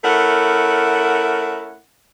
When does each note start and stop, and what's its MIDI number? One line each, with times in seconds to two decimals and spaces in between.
0.03 1.77 57
0.03 1.77 61
0.03 1.77 64
0.03 1.77 70
0.03 1.77 78